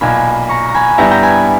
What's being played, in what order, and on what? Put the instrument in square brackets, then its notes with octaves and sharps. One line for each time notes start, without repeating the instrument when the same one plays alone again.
[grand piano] B1 A#2 A#3 [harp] G#5 B5
[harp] A#5 C#6
A#5
G#5 B5
[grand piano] G2 G3 B3 E4 [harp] G5 A#5
[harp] G5 A#5
G#5 B5